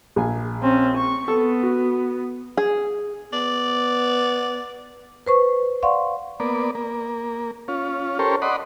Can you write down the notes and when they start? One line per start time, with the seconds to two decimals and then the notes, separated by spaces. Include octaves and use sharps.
0.16 A#1 G#5
0.62 C4 C#4
0.97 C#6
1.28 B3 A4
1.63 F#4
2.57 G#4
3.33 B3 D5
5.27 B4 C5 C#6
5.83 D5 F5 F#5 C6 C#6
6.40 A#3 B3 D5
6.75 A#3
7.68 C#4 F4
8.19 C#4 G4 A4 A#4 C5 C#5
8.42 D5 D#5 F#5 B5 C6